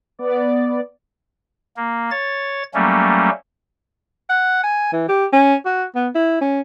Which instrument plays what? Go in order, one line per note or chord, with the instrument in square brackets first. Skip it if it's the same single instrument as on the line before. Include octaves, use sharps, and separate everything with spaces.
[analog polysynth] B3 D5
[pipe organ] A#3
C#5 A6
F#3 G3 A3 A#3 C#4
[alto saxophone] F#5
G#5
E3
G4
C#4
F#4
B3
E4
C#4